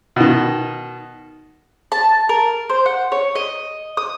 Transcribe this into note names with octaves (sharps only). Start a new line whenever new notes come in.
B2 D#3
A5
A#4
C5
F#5
C#5
D#5
D#6